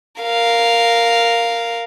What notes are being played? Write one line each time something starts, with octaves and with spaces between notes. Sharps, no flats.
A#4 F5